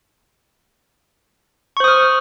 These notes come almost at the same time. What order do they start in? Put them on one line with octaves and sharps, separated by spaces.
C#6 C5 D#6 F6